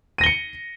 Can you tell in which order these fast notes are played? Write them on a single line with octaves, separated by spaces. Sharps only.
D#7 A#6 G7 C#7